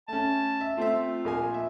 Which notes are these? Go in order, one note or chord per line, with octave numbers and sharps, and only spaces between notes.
A3 C#4 A5
E5
A3 C4 F4 E5
A#1 A#3 G#5
E5